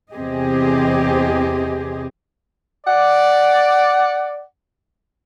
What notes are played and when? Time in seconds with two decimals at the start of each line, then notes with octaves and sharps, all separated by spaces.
0.14 E2 C3 C4 G4 G#4 D#5
2.87 D5 F#5